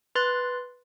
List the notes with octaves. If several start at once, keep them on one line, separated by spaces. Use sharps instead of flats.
B4 C6 F#6 A6